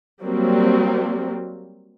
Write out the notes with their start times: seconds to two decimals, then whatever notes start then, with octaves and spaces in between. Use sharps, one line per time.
0.23 F#3 G3 A#3 C4